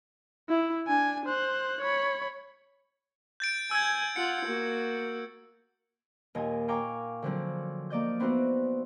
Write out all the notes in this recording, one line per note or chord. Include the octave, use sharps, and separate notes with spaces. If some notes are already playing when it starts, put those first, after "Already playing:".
E4
D4 G#5
C5 F#6
C#5 B5
G6 A6 D7
G#5 E6 G#6
F4 F#5 C#7
A#3 F#4
D#2 A#2 D#5 G#5
F5 G5 G#5 A#5 C#6 D6
D3 F3 F#3 C4
A#3 D5 D#5 G6
B3 C4 D#4 E4 F#4 C5